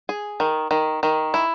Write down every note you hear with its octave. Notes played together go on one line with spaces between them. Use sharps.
G#4
D#3
D#3
D#3
E4